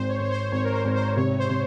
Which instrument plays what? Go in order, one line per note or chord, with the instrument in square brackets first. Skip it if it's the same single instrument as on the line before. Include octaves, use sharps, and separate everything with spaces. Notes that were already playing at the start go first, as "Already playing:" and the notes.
Already playing: [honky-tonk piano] G#1 [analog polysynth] C5
[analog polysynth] C#5
[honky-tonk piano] G#1 [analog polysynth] C#5
[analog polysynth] C5
[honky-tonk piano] G#1 [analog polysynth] C#5
[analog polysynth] A#4
C5
[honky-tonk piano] G#1
[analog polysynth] C5
[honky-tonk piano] C3 [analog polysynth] C#5
[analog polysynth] C5
[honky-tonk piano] C3